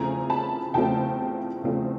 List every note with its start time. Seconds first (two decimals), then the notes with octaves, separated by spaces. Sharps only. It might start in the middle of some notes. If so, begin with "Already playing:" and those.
Already playing: E2 C#3 F3 A3 C4 G#5 A#5
0.30 A5 B5
0.74 E2 C#3 F3 A3 C4 G5 A5
1.64 E2 C#3 F3 A3 C4